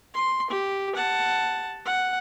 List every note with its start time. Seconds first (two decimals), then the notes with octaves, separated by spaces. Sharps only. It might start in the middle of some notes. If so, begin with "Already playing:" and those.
0.14 C6
0.50 G4
0.95 F#5 A5
1.85 F#5